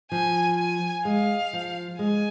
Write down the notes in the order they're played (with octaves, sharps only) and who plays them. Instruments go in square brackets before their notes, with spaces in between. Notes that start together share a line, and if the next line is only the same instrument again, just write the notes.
[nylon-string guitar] F3 [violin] G#5
[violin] G#5
[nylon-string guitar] G#3 [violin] F5
[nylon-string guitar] F3
[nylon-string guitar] G#3 [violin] G#5